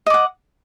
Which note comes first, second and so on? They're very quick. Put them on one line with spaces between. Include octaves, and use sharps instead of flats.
D#5 D6 F#5